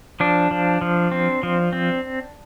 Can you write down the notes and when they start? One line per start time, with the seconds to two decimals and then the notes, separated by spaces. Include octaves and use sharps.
0.20 F3 D4
0.51 F3
0.81 F3
1.12 C4
1.43 F3
1.73 C4